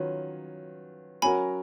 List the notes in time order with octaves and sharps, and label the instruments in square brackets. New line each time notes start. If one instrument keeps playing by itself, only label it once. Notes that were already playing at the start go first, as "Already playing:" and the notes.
Already playing: [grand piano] D#3 F#3 C#4 F4 B4 [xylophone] C#5
[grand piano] F#3 C#4 F#4 A#4 [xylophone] G#5 B5